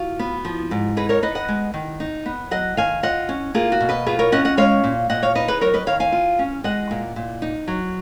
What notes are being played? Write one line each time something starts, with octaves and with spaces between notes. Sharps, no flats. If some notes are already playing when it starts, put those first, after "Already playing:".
Already playing: F4 F#4
B3
F3
G#2
D#4 G#4 B4
A#4 C#5
B3 B4 D#5
D#5 F#5
G#3
D#3
D#4
B3
F#3 D#5 F#5
D#3 F5 G#5
F4 D#5 F#5
C#4
A#3 F4 G#4
F#4
B2
B4 D#5
F4 G#4 B4
A#4 C#5
C#4 D#5 F#5
D#5 F#5
G#3 C#5 F5
A#2
A#2 D#5 F#5
C#5 F5
D#4 B4 D#5
G#4 B4
F#3 A#4 C#5
B4 D#5
D#3 C#5 F5
F5 G#5
F4
C#4
G#3 D#5 F#5
A#2
A#2
D#4
F#3